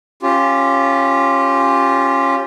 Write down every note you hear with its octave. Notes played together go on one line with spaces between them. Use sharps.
C#4 F4 G4